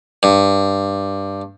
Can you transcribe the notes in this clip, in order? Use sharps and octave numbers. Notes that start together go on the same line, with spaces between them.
G2